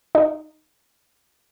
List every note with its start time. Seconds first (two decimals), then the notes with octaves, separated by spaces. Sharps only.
0.15 D#4